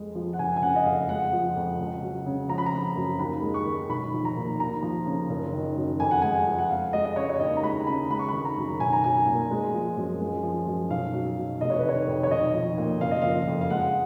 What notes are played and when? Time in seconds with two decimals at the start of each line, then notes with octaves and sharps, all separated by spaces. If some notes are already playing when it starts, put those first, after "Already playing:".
Already playing: F2 G#3
0.15 F3
0.33 F#5
0.39 F#1 G#5
0.56 G#5
0.63 C#3 F#5
0.76 D#5
0.85 F2 F5
1.09 G#3 F#5
1.32 F3
1.56 F2
1.79 C#2
2.02 F#3
2.26 C#3
2.49 F3 A#5
2.58 B5
2.66 A#5
2.73 C#3
2.96 F#2
3.19 D#2 B5
3.42 G#3
3.54 C#6
3.66 D#3
3.89 B1 B5
4.13 F3
4.25 A#5
4.36 A#2
4.59 D#2 A#5
4.82 F3
5.06 C#3
5.29 F#1
5.53 D#3
5.76 F#2
6.00 F2 G#5
6.11 F#5
6.22 G#3 G#5
6.46 F3
6.59 F#5
6.70 F2 F5
6.93 G#3 D#5
7.05 D#5
7.16 C#3 C#5
7.29 C#5
7.40 D#2 D#5
7.57 A#5
7.63 G#3 B5
7.87 C#3 B5
8.10 G#3 B5
8.19 C#6
8.29 D#3 B5
8.45 A#5
8.57 F#2
8.80 B1 G#5
8.93 A#5
9.04 F#3 G#5
9.26 A#2
9.51 G#3
9.73 F3
9.97 F#2
10.21 G#3
10.43 F3
10.67 F#2
10.90 B1 F5
11.13 F#3
11.37 B2
11.61 F1 D#5
11.70 C#5
11.79 B4
11.85 D#3 C#5
12.07 F2
12.23 C#5
12.31 B1 D#5
12.54 F3
12.78 A#2
13.01 F#1 F5
13.11 D#5
13.22 F3 F5
13.47 F2
13.61 F5
13.70 G#3 F#5